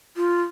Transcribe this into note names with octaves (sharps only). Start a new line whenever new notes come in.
F4